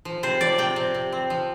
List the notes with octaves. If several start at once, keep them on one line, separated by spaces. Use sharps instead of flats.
F3
C3 C5
F3 D5
C3 G5
C3
C3
C4
F3